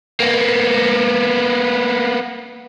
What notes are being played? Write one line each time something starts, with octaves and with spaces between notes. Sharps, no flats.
A#3 B3